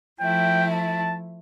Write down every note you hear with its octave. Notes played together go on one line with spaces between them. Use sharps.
F3 A3 E4 G5
A5